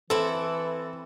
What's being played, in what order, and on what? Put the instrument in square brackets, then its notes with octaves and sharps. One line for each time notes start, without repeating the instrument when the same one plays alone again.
[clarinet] E3 [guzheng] C4 E4 [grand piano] A4